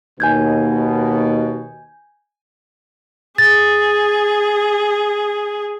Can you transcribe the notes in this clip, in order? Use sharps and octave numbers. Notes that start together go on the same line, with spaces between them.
D#2 B2 G#5 G6 G#6
G#4 A6